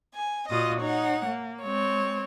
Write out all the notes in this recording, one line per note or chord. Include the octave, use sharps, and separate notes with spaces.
G#5
A#2 F4 F#4 D#5 D#6
D#4 C#5 F#5
A#3
G#3 C4 C#5